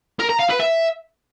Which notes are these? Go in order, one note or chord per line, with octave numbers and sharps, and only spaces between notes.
A#4
A#5
F5
B4
E5